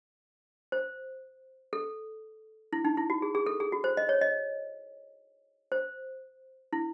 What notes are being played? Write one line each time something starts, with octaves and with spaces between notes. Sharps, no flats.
C5
A4
E4
D#4
E4
F#4
G#4
G#4
A4
G#4
F#4
C5
D#5
C#5
D#5
C5
E4